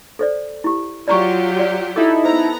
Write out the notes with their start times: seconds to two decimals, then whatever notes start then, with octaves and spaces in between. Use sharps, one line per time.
0.19 A4 C5 D5
0.64 E4 G4
1.08 F#3 F4 G4 D5 A#5 C#6
1.59 D5
1.96 D#4 E4 A4 D6
2.25 B3 C5 A#5